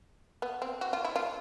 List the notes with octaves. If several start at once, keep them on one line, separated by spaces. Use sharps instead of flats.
B3
C4
F#4
F4
E4
F4